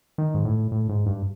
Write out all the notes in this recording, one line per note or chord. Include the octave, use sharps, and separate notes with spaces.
D#3
G#2
A2
A2
G#2
G2